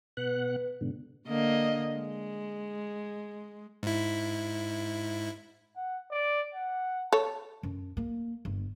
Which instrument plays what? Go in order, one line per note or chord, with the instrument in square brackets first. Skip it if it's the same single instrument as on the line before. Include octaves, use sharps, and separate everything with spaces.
[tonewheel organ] B2 F#5 F#6 [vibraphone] B4
[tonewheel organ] G#2 B2 D3
[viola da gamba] D3 A#3 D#5
G#3
[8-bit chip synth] G#2 E4
[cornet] F#5
D5
F#5
[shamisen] A4 C#5 [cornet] A5
[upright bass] F#2
A#3
G1